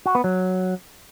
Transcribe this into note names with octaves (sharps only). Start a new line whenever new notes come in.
F#4
B3
F#3